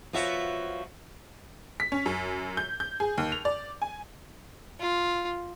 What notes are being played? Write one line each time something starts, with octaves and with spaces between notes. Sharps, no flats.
F3 B3 F4 F#4 C#5 E5
B6
C#4
F#2
G6
G6
G#4
D#2
F7
D5
G#5
F4